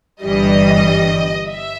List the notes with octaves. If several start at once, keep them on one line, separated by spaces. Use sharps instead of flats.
G1 G2 E3 G3 D#5
E5